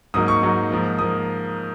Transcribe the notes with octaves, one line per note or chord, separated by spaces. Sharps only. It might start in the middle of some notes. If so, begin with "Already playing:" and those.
G#2 F#3 A#3 D#4 D#6
C#6
G#2 F#3 A#3 D#4
G#2 F3 A#3
F3 A#3 D#6